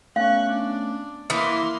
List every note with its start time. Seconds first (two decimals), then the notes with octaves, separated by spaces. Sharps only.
0.16 A3 B3 C#4 F5 C#6 F#6
0.49 D4
1.30 E3 A#3 E5 B5 C6 D#6